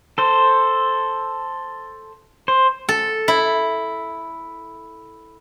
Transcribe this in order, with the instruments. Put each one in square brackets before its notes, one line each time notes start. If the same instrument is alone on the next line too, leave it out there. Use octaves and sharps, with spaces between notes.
[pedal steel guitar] A4 C5
C5
[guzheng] A4
E4